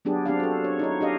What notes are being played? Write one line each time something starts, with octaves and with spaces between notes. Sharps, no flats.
F#3 B3 D4 G4 G#4
C4 D4 G4 F5
F#4 A4
C#5
D#4 E4 C#5
D4 G4 D#5 F5